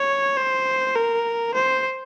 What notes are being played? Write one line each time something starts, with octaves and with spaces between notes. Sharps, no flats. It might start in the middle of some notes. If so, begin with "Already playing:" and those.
Already playing: C#5
C5
A#4
C5